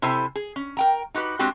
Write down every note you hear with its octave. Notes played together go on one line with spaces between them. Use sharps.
C3 E4 A4 C5 G#5
G#4
C#4
A#4 G5 A#5
D#4 F#4 G4 B4
G#3 C4 D4 F#4 G4